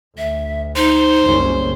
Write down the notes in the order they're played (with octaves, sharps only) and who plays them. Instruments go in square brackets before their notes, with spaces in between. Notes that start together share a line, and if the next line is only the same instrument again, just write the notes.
[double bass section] D2 [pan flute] E5
[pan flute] D#4 [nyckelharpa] C5
[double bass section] F#1 C2 C#4